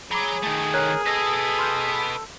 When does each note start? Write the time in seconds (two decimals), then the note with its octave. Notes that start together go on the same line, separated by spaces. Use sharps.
0.11 G#4 C#5 A#5 B5 D6
0.43 D#3 A3
0.74 A#4 C#5 F#6 G#6
1.06 A4 B4 D#5 G#6 A#6
1.59 C6 F6 G6